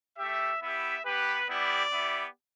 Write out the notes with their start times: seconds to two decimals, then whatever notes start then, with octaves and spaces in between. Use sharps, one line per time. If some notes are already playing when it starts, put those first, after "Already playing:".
0.18 A3 G4 E5
0.62 B3 E4 G4 E5
1.05 B3 G4 B4
1.48 G3 B3 E4 G4 D5
1.93 B3 E4 G4